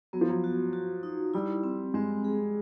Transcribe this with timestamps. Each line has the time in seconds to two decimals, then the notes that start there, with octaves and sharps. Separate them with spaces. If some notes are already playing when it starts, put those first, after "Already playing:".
0.13 F#3 B3
0.21 F3
0.29 F#3
0.44 F#4
0.73 F#4
1.03 D#4
1.34 G3 E4
1.64 C4
1.94 G#3 C4
2.25 G#4